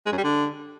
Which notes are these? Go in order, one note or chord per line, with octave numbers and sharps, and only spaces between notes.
G#3
F#2
G3
D3